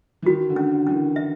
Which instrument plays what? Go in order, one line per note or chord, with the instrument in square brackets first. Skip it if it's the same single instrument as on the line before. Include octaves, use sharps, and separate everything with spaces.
[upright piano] E3
[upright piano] D#3 [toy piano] F#4
[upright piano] D3
[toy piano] C#4
[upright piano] D3
[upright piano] E3 [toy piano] C#4
[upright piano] D#3
[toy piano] E5